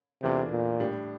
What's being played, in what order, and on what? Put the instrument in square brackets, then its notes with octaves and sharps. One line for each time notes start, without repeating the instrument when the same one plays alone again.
[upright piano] E2 E3 A3 D4 F4 [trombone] C3
[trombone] A#2
[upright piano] A2 G3 D4 G4